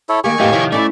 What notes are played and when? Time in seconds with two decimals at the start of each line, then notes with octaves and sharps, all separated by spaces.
0.09 E4 A4 C#5
0.24 D#3 A#3 G4 G#5 C#6
0.40 F2 A2 E3 A3 A#3 G4 D#5 F5
0.53 C3 D#3 F3 E4 C#5
0.72 A3 C#4 D4 E4 D5